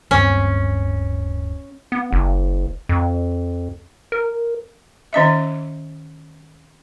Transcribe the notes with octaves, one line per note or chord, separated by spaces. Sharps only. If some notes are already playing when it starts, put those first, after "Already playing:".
D1 G2 C4 C#4
B3
F#1
F2
A#4
D#3 C#4 D#5 E5